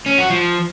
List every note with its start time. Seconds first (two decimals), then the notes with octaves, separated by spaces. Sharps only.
0.06 C#4
0.18 F#4
0.30 F3